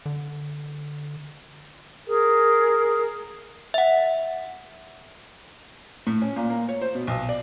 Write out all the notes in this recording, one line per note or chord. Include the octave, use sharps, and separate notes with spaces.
D3
G#4 A#4
E5 F#5
A2
C#4
A#2
A#3
C#5
C5
B2
B1
D5